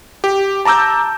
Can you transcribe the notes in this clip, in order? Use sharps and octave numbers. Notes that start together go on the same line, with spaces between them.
G4
A5 A#5 D6 E6 G6